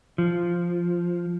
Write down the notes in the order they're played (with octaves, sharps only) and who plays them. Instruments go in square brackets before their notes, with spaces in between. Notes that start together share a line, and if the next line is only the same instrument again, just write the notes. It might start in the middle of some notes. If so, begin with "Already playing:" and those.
[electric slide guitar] F3